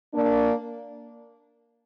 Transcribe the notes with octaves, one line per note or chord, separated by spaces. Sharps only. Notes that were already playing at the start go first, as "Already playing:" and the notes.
A#3 D4